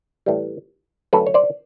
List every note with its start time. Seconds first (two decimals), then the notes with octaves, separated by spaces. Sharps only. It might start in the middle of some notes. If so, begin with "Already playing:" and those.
0.26 A2 E3 G3
1.13 F#2 D3 F#3 A3 A4 B4
1.27 C#5
1.34 C5 D5